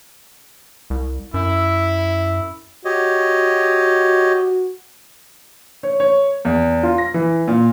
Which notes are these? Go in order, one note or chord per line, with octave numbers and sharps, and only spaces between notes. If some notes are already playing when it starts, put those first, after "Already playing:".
C2
F#2 E4
F#4 G4 C#5 D#5
C#5
C#5
E2
F4
A#6
E3
A#2